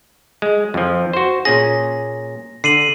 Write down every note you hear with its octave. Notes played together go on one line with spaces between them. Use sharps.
G#3
F2 F3
F#4 C5
A#2 C#4 G#4 A#6
D3 C7 D#7 F#7